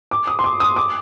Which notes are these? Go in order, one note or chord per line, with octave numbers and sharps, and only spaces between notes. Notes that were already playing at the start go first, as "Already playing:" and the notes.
D6
D#6
C6
D6
D#6
D6